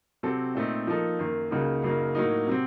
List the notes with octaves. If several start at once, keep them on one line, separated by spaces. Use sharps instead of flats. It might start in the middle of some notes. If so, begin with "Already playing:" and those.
C3 F#3 C4 F#4 A4
A#2 A3 C4 D#4
F3 A#3 D#4 A4
F#2 D#3 A#3
C#2 C#3 F#3 A#3 D#4
F#2 C#3 F#3 A#3 D#4
A2 F#3 A#3 D#4
C3 F#3 C4